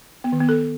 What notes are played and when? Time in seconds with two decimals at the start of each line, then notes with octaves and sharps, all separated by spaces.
0.24 B3
0.32 D#3
0.41 B3
0.49 A4